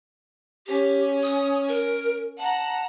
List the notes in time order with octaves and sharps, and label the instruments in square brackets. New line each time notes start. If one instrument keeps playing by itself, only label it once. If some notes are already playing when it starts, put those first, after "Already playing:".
[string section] C#4 [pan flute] G4
[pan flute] D#6
A#4
[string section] F#5 A#5 [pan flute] A5